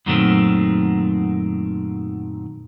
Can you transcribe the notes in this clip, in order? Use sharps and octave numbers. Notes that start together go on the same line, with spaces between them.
F#2 A#2 D#3 F#3 A3 C4